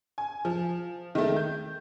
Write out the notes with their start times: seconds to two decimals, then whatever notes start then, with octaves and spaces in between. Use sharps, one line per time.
0.18 G#5
0.45 F3
1.15 D#3 G#3 A3
1.36 G6